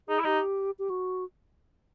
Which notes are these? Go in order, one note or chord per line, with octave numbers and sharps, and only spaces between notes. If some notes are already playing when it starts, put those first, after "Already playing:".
D#4 G#4
E4
D#4 G4
G4
F#4